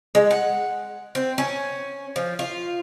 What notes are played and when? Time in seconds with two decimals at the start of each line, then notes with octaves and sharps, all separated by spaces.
0.15 G#3
0.31 F#5
1.15 C4
1.38 C#4
2.16 F3
2.39 F4